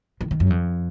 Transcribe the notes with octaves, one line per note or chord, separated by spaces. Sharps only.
D#3
D#3
F#2
F2